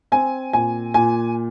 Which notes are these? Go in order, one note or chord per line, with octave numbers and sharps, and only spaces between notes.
C4 G#5
A#2 G#5
A#2 G#5